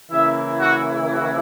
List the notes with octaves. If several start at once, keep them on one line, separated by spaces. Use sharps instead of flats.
C#3 E3 A#3 E4 E5
F#4
F#4